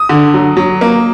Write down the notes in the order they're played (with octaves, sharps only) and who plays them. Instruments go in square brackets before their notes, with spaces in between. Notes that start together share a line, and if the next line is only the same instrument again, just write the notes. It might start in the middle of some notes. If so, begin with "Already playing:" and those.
Already playing: [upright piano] D#6
D3
F#3
F#3
A#3